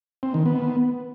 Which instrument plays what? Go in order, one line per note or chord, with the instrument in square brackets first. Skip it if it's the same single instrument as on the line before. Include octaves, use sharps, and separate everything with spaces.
[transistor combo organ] C4
D#3
B3